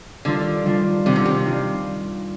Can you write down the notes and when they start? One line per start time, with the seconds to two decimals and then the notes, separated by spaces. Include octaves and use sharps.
0.25 D3 D#3 G3 D4 F4
0.66 D#3 G3 D4 F4
1.05 C3 D#3 G3 D4 F4
1.16 D3
1.25 C3
1.46 D#3 G3 D4 F4